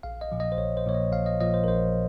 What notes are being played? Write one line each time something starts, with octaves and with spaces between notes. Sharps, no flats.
A#1 F5
D#5
A#2 F3
D#5
C5
A#1 C#5
C5
A#2 F3 C#5
D#5
A#1 F5
D#5
A#2 F3 D#5
C5
A#4
A#1 C5